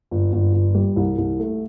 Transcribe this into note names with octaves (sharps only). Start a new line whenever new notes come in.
G1
G1
G1
G3
C2
C2
A3